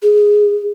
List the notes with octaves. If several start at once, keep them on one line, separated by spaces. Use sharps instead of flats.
G#4